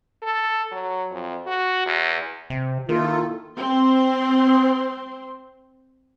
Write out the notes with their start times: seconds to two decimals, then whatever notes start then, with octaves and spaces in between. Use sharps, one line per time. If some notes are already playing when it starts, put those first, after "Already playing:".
0.22 A4
0.72 F#3
1.11 F2
1.46 F#4
1.86 E2
2.50 C3
2.89 D#3 A#3 E4 F4 A4
3.56 C4 C6